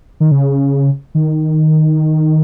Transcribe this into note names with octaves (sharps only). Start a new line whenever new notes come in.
D#3
C#3
D#3